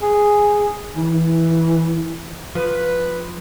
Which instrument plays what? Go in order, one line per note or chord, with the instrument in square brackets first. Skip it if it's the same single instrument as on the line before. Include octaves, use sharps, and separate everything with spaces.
[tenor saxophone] G#4
E3
[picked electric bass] F3 [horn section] B4